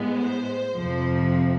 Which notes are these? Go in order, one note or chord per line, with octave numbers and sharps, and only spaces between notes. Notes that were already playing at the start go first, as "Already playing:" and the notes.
Already playing: A2 G#3 B3
C5
F2 C3 F3